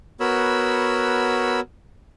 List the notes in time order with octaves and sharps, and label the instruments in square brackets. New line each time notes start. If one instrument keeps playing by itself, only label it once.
[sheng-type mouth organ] B3 F#4 A#4 C#5 B5 E6